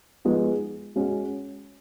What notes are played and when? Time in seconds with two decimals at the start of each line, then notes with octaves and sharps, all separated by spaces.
0.25 F3 G#3 B3 D#4 G#4
0.96 G#3 C#4 F#4 C#5